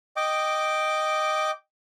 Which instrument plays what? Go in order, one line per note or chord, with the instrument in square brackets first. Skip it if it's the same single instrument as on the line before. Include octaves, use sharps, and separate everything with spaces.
[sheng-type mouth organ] D#5 G5 D6